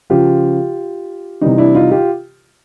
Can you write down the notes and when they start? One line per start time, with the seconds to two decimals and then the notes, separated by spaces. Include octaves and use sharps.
0.10 C#3 F3 F4 G4
1.41 C3 E3 G3 D#4
1.58 D4 E4
1.75 D#4 F4
1.91 F4 G4